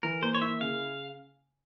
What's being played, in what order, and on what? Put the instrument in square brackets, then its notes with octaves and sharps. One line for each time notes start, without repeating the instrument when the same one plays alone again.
[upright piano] E3 [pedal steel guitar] A#4
[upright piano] A#3 [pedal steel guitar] C5
[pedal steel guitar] C#5
[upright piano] E4 [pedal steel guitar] E5
[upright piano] C#3 [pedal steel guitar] F5